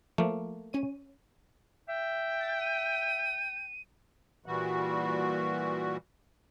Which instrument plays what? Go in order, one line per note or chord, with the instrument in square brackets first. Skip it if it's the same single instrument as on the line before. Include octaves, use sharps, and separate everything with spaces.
[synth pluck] F3 [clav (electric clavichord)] A3 A#3
[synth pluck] C#4 C#5 D#7
[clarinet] E5 [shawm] G5
[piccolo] A6
D#7
[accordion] A#2 E3 G3 F#4